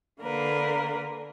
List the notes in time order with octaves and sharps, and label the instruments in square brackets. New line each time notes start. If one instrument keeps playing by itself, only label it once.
[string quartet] D3 A#3 A#4 B4